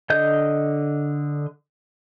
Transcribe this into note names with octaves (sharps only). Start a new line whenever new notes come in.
D3 D#5 G6